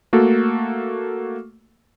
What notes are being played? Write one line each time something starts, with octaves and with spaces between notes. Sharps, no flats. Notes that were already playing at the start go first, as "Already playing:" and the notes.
A3 A#3 F#4 A4